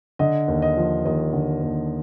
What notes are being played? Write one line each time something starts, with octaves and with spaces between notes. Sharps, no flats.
D3 D#5
D#2
D#5
F3
D#2 D#5
D3
D#2